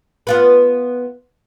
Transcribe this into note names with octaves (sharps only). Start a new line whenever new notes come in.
B3 F4 B4